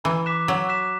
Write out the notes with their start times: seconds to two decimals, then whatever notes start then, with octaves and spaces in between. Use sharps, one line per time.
0.04 E3 A#5
0.26 D6 F#6 B6 E7
0.48 F#3 A#5
0.69 D6 F#6 B6 E7